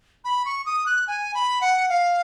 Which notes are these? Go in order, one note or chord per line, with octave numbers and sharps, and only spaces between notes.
B5
C#6
D#6
F#6
G#5
B5
F#5
F5